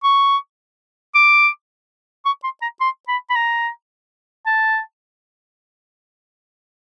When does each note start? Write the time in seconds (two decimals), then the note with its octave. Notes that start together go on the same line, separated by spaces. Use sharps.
0.04 C#6
1.15 D6
2.25 C#6
2.44 C6
2.62 A#5
2.81 C6
3.08 B5
3.30 B5
3.36 A#5
4.46 A5